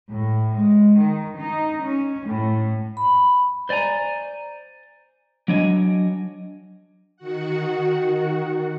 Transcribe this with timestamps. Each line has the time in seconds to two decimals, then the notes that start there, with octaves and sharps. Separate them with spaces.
0.10 A2
0.55 G#3
0.97 D#3
1.38 D#4
1.84 C#4
2.27 A2
2.97 B5
3.69 C5 D5 D#5 G#5 A#5
5.48 F#3 D4 C#5 D#5 G5 G#5
7.17 D#3 F#4 F#5